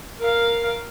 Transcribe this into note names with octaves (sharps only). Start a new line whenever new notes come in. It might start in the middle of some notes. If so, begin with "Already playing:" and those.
A#4 F5